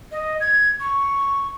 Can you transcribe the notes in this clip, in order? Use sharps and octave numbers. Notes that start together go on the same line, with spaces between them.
D#5
G#6
C#6